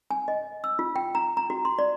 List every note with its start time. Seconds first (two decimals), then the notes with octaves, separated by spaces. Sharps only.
0.11 G#5
0.28 D#5
0.64 E6
0.79 F4
0.96 G5
1.15 A#5
1.37 A#5
1.50 F#4
1.65 C6
1.79 D5